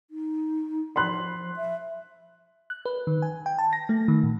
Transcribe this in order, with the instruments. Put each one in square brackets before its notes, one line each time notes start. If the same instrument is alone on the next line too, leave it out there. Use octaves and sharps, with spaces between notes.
[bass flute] D#4
[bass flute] F3 [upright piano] B5 C6 F#6
[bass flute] E5
[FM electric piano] F#6
B4
D#3
G#5
G5
A5
A#6
A3
D#3
A#2